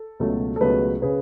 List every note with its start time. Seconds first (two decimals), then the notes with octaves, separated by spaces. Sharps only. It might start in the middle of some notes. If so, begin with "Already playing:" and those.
Already playing: A4
0.20 C#2 B2 F#3 A3
0.56 A4
0.61 C#2 B2 F#3 A3 G#4 B4
1.02 C#3 G#4 B4